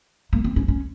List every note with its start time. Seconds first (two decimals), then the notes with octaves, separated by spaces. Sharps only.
0.33 A#3
0.44 C4
0.56 C#4
0.68 C#4